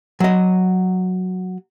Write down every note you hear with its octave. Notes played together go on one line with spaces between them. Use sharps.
F#3 D#5